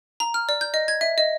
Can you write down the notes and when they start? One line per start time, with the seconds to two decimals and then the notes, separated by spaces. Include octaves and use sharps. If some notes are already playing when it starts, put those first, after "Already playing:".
0.20 A#5
0.34 F6
0.49 D5
0.61 G6
0.74 D#5
0.88 G#6
1.01 E5
1.18 D#5